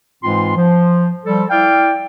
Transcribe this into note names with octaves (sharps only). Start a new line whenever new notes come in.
G#2 E3 G#3 C4 F4 C6
F3
F3 G3 A4
E4 D5 F5 G5